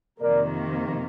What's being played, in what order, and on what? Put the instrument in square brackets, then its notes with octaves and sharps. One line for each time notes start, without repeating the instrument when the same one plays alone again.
[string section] F2 C3 D#3 A#3 [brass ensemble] A#4 D5